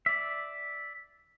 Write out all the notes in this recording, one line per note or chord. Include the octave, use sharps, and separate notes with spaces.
D5 E5